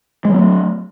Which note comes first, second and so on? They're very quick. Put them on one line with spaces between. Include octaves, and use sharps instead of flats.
G#3 F#3 B3 A3